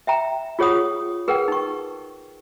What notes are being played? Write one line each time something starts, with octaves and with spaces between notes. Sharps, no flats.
E5 G5 A#5
F4 G#4 C#5 F#5 D#6
G#4 A#4 B4 F#5 G5
D#4 C#6